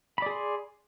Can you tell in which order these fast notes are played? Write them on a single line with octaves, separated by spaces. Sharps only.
B5 D5 G#4 C6